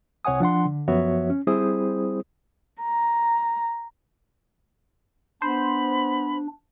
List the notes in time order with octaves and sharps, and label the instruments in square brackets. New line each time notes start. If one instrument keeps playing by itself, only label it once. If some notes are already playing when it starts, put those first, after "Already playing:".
[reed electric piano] C2 C3 C#5 F#5 G#5 D#6
F3 D4 F#5 C6
D3
F#2 F3 B3 F#4 C#5 E5
C#4
G3 C4 E4 G#4 C5 D#6
[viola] A#5
[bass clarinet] B3 [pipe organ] D4 [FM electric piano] C5 [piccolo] B5